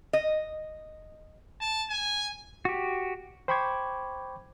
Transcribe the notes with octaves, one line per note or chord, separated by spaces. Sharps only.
D#5
A5
G#5
F#4 G4
C5 G5 B5 C#6 D6 G#6